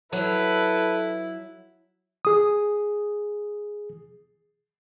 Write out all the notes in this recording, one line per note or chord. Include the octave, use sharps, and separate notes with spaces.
F#3 E4 A4 B4
G#4 D#6